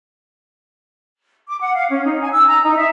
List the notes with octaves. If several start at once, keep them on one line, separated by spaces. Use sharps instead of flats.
D6
F#5
F5
C#4
D#4
G#5
E6
A#5
D#4
E5